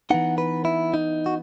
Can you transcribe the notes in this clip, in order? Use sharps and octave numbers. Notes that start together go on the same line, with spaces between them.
E3 B3 D#4 F#5
B4
E4
D#4
F#4